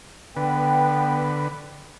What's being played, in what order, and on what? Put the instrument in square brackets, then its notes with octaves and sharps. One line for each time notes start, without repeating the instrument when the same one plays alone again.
[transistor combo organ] D3 B4 [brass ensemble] B3 G5